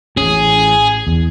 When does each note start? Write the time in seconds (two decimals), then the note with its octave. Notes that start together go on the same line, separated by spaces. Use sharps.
0.17 A1 C#4 G#4
1.07 E2